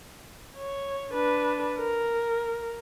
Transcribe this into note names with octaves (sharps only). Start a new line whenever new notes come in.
C#5
D4 B4
A#4